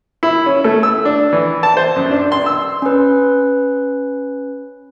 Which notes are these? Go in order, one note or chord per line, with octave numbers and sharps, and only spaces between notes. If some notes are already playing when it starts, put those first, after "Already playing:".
E4
C#4
A3
E6
D4
E3
A5
C5
F#2
D4
C6
E6
C#4 B4